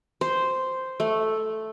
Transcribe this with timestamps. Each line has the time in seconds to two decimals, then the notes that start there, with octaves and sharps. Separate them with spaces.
0.21 C5
1.00 A3